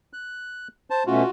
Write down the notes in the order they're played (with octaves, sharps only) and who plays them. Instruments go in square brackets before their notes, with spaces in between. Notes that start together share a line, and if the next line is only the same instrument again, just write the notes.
[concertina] F#6
C5 A5
[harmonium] B2 A3 C#4 [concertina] F4 F#4